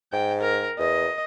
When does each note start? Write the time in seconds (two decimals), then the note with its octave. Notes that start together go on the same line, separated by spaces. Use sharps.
0.13 G#2 G5
0.41 A#4
0.79 E2 D#5